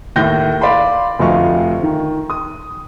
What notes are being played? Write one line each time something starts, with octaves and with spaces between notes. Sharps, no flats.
D#2 A2 G6 A#6
D5 F5 B5 C6
F1 D2 F3 D#5 F5 C#6
D#3
D#6